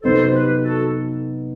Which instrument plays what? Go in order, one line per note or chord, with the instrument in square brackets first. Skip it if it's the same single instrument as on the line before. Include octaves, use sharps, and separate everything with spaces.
[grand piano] C3 F#3 B3 D#4 [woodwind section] A4 C5
[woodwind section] G4 B4
F#4 A4